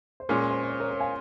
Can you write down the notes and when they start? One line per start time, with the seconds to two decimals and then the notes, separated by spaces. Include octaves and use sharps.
0.20 C5
0.29 A#2 G#3 C#4 A#4
0.41 A#4
0.50 C5
0.63 C#5
0.70 C5
0.80 A#4 C#5
0.90 A#4 C#5
1.00 F5 G#5